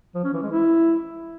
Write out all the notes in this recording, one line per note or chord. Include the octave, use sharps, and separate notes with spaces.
F3
C#4
E3
G#3
E4